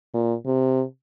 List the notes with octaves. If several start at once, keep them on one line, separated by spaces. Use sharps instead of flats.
A#2
C3